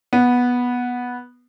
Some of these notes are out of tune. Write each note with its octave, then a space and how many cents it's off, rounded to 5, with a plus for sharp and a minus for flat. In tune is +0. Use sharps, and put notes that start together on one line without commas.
B3 -10